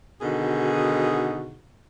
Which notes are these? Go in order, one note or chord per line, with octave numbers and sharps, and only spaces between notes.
B2 D3 D#3 D#4 F#4 G#4